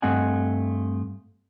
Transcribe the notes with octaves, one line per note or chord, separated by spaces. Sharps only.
G2 A3 C4 D#5 F#5 G#5